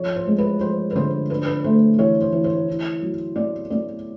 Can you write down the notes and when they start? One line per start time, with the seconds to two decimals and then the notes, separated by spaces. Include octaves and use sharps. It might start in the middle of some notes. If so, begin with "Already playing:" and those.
Already playing: F3 C#5
0.16 C5
0.27 G#3
0.38 B4
0.61 F3 C5
0.91 B4
0.95 D3 C5
1.30 D4 B4
1.46 B4
1.64 A3 C5
1.98 E3 C#5
2.21 C5
2.33 E3
2.44 C5
2.68 E4
3.02 F#3
3.36 B3 D5
3.70 B3 D5